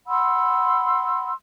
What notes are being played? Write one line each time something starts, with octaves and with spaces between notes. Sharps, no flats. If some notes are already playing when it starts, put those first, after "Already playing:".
F#5 B5 C6 E6